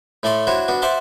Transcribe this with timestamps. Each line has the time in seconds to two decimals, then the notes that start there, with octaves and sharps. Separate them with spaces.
0.23 A2 A3 A4 D5 C6
0.47 D4 E4 F#4 C5 C#5
0.68 B3 D4 F#4
0.82 C5 D5 E5 F#5 A5 C6